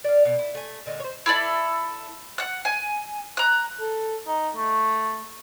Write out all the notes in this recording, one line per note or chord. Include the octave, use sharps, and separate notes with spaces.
D5 F5
B2
E4
A3 G#5
A#2 D3 D#4
C5 C#5
E4 A4 D5
F#5 F#6
G#5
A#5 F#6
A4
D#4
A3